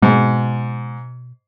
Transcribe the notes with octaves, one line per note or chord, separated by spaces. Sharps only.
G#2 B2